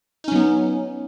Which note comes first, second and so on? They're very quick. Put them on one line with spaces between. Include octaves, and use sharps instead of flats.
D#4 C#4 F#3 B3